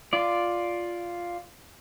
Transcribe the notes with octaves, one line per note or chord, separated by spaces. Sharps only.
F4 D5